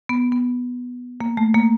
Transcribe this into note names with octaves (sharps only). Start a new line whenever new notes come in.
B3
B3
A#3
A3
A#3